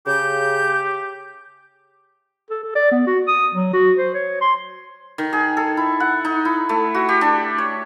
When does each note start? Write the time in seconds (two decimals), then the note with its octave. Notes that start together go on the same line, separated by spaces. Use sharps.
0.07 C#3 G4 G6
2.50 A4
2.63 A4
2.75 D5
2.92 B3
3.07 F#4
3.28 D#6
3.54 F#3
3.73 F#4
3.97 C5
4.14 C#5
4.41 C6
5.18 D#3
5.33 G#4
5.57 A4
5.77 E4
6.00 F#5
6.25 D#4
6.45 E4
6.69 A3
6.94 F#4
7.09 G4
7.21 D4
7.58 C#5